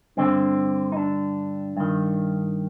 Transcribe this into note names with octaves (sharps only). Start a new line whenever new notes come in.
G2 D3 C4
D#4
D4
G2 D#3